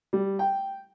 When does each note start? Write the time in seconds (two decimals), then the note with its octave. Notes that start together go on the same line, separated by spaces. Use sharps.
0.13 G3
0.39 G5